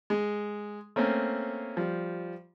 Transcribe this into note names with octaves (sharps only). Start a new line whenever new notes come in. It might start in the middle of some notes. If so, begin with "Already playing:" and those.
G#3
A3 A#3 C4 C#4
F3 G3